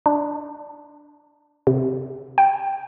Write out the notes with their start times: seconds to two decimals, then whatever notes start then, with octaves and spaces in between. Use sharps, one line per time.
0.06 D4
1.67 C3
2.38 G5